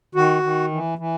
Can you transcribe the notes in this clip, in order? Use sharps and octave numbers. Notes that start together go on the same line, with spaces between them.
D#3 F#4
D#3
E3
E3